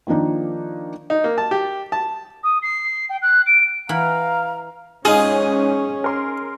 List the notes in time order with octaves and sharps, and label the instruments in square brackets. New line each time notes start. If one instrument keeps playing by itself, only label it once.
[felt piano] D#3 F3 A#3 D4 D#4
[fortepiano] D#4
A#3
A5
G4
A5
[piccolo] D#6
C7
G5
F#6
D7
[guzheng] E3 F#5 B5 [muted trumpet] F5 [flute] A#5
[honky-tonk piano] G#2 [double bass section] C#4 [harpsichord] D#4 F4 [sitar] G#4
[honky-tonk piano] A#4 C6